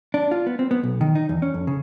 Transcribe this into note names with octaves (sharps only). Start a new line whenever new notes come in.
D4
F4
B3
C4
B3
B1
D#3
D#4
E2
C#4
F2
C#3